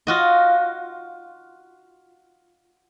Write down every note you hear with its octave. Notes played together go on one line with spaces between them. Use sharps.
F4 F#4 D#5